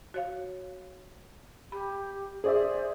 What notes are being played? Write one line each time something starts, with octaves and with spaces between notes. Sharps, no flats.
F#4 C#5 F5
G4 B5
G#4 C5 D5 E5